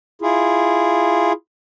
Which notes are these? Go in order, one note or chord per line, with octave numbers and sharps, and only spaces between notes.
E4 F4 G#4